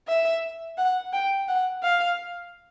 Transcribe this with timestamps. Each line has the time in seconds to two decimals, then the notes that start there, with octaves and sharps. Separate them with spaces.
0.08 E5
0.78 F#5
1.13 G5
1.48 F#5
1.83 F5